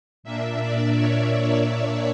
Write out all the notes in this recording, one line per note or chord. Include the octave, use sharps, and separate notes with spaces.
A#2 A#3 D4 E5
D5
C#5
C#5